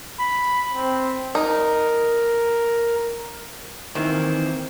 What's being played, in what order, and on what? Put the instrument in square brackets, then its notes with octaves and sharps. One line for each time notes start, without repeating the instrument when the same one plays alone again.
[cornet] B5
C4
[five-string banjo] D#4 [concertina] A#4
[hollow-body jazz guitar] D#3 E3 [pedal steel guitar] A#3 C4 C5